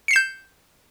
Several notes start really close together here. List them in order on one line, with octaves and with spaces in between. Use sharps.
C#7 C7 E7 G6